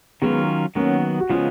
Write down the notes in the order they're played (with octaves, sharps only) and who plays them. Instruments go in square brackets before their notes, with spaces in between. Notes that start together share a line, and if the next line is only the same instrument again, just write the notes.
[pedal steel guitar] D#3 F#3 C#4 F4 [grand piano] G#3 B3
[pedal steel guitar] D#3 F#3 B3 [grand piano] A#3 C#4
[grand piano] F#4
[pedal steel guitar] C#3 F3 G#3 B3 [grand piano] C#4 F4